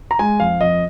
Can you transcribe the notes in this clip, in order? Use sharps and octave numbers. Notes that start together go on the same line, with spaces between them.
A#5
G#3 G#5
F2 F5
F2 D#5